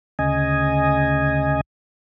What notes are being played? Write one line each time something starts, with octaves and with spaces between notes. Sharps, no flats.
D2 C#3 D#5 G#5